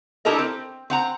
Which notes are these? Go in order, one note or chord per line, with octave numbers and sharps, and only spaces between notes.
D4 E4 G4 A4 A#4 D#5
C4
C4 F#5 A#5